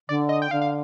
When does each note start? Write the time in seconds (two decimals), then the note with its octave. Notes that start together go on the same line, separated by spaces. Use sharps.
0.09 D3 D5
0.29 D#5
0.42 G5
0.51 D3 F5
0.62 F5